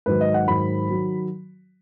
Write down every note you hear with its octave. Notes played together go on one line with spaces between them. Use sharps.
G#2 D#3 F#3 B4
D#5
F#5
G#2 D#3 F#3 B5
D#3 F#3